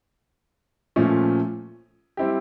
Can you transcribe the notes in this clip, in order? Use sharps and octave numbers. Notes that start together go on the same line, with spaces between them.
A#2 F3 A3 C#4
G3 C4 E4 G4